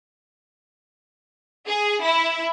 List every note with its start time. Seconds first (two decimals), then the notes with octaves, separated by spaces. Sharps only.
1.68 G#4
2.04 E4